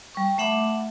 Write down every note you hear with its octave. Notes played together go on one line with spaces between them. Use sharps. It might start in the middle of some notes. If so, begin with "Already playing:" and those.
G3 C#6
A3 E5 F#5 B5 D6